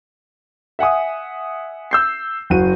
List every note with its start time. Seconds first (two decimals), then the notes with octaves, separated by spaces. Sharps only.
0.79 E5 F#5 G#5 D#6
1.91 E6 G6 C7
2.50 F#1 F#4 D#7